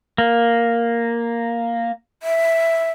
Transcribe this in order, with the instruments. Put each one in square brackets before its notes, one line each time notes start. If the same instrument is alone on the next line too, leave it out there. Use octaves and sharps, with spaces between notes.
[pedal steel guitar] A#3
[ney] E5